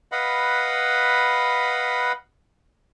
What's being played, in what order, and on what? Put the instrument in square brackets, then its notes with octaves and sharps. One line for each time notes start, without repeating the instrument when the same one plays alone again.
[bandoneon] B4 D#5 F5 F#5 B5